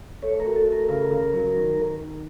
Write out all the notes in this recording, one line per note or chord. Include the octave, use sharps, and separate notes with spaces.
A3 C#5
F#4 A#4
A4
A3
A#4
C#3 A#4
C#3
F#3
D#3
D#3
D#3